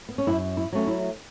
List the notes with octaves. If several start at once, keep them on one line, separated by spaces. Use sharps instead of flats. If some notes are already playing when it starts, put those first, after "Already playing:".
B3
C#4
F#2 E4
E4
F#3 A3 C#4
E4